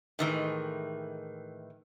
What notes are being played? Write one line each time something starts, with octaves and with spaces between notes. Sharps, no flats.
A2 D#3 E3 G#3